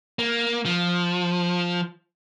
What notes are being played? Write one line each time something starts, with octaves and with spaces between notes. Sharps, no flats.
A#3
F3